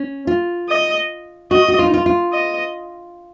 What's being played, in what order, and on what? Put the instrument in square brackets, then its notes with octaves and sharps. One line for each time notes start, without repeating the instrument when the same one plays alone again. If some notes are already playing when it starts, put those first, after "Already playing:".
Already playing: [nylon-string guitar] C#4
F4
[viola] D#5
[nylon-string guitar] F#4 [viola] D#5
[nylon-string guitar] F#4
F4
D#4
F4
F4
[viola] D#5